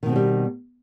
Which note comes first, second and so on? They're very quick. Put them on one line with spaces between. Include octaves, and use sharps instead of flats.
D#3 B2 C4 G#3 G3